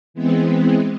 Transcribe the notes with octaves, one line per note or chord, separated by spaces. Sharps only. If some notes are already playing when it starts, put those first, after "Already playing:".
E3 G#3 B3 C4